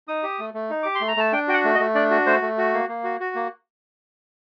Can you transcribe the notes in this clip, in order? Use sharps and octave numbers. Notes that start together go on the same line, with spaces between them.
D#4 D#6
G4
A3
A3
D#4
G4 D6
C6
A3
A#5
A3 A5
D4 G5
F#4 G5
F#5
A3
D#5
A3
D4 D5
F#4
A3 C5
A3
F#4
A#3
A#3
F#4
F#4
A#3